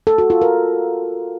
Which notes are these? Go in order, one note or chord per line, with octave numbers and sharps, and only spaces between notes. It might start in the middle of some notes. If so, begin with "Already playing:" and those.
A4
F#4
F4
A#4